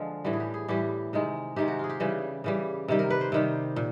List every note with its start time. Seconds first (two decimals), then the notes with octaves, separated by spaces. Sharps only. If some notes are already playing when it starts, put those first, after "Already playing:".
Already playing: D3 F3 G#3 F4
0.25 A2 E3 G3 F#4
0.33 G#4
0.40 G4
0.54 G#4
0.68 A2 E3 G3 G4
1.13 C3 D#3 G#3
1.56 C3 D#3 G#3 G4
1.68 F#4
1.79 F4 G#4
1.90 G4
2.00 C#3 E3 G3
2.44 C#3 E3 G3
2.88 C3 D#3 G3
2.99 A#4
3.10 B4
3.21 C5
3.32 C3 D#3 G3
3.76 A#2